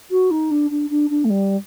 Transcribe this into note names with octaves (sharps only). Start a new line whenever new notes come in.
F#4
D#4
D4
D4
D4
D4
A3
G3